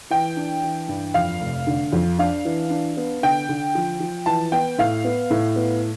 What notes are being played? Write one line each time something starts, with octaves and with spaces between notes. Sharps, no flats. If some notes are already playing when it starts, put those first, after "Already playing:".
E3 G5
D4
E3
G2
F2 F5
F1
D3
F2
D4 F5
E3
D4
B3
D3 G5
D3
F3
F3
E3 A5
B3 G5
A2 F5
B3
A2
B3